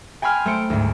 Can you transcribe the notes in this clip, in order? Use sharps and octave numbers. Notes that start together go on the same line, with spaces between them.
G5 G#5 B5 C6 F6
A3 C5 C#7 D7
D2 G#2